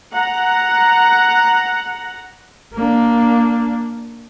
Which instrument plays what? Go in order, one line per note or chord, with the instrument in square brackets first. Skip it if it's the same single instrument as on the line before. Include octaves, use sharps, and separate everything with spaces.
[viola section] F#5 A#5
[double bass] A#3 D4